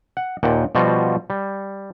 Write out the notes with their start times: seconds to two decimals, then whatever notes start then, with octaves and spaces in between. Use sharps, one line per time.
0.17 F#5
0.43 D#2 A#2 F#5 G5
0.75 B2 F3 G3 F4 F#4
1.30 G3